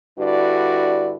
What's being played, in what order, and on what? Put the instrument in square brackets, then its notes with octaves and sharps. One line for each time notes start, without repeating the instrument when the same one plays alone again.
[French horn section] G2 D3 E4 F#4 D5